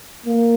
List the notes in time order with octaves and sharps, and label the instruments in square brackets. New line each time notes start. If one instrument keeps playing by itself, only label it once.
[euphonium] A#3